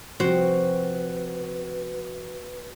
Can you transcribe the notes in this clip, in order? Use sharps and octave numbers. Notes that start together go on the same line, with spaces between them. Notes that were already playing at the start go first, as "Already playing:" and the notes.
C3 F3 C4 F#4
B4